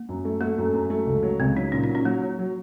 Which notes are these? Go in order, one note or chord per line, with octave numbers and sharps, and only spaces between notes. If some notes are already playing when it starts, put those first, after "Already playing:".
Already playing: A#3
F#2
A3
A3 A#3
F#2
F#2
A3
C#2
F#3
C#2 C4
F#3 D#4
A#2 C#4
D#4
F#3
C#4
F#3 A#3
F#3
F#3